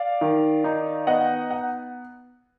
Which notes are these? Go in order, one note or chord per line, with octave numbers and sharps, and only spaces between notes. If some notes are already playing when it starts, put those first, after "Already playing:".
Already playing: D5 F5
D#3
D#4
B3 D#5 F#5
F#5